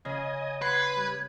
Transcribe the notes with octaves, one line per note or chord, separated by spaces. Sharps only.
C#3 D#5 G#5
B4 F#5 C6 G#6
G3